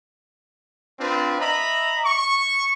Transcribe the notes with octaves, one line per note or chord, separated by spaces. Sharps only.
C4 D4 F4 B4
D#5 E5 A#5 B5
C#6